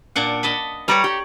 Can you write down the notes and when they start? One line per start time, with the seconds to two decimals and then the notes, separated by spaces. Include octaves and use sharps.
0.16 A#2 D4 F#5
0.43 D#5 A5 B5
0.88 G3 B4 C#5 D5 A#5
1.04 G4